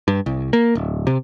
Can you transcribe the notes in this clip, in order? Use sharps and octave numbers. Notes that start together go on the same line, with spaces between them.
G2
C2
A#3
D1
C3